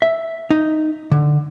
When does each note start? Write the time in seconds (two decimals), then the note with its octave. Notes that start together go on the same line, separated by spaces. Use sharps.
0.02 E5
0.51 D#4
1.12 D3